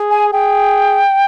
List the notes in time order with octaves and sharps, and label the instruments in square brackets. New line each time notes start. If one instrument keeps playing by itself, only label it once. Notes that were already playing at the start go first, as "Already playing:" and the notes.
Already playing: [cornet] G#4
[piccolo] G#5
[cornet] G#4 [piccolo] G5